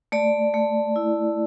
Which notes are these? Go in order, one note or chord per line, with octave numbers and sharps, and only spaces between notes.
A3 D5
A3
E4